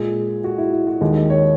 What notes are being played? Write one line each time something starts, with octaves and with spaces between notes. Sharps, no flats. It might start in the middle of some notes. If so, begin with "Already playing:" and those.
Already playing: A#2 G#3 G#4
F#4
E4
E4
F#4
D#2 D#3 G#3 D#5
D#5
C#5